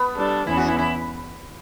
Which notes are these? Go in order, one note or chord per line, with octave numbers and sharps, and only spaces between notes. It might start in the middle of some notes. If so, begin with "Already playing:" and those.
Already playing: B3
G3 D4 A4
E2 C#3 E3 B3 E4
F#4
E4
E4